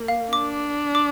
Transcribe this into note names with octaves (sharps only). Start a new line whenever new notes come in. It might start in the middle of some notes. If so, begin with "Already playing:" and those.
Already playing: A#3
F5
D4 D6
D6